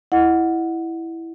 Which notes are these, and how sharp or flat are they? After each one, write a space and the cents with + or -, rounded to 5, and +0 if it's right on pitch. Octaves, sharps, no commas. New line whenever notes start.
E4 +0 D#5 +0 F#5 -10